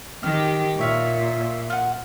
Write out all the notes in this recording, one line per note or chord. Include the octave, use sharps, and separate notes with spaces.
D#3 G4 F6
A#2 C#5 E5 F5
F4 F#5